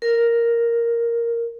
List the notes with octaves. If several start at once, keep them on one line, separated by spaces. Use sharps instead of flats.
A#4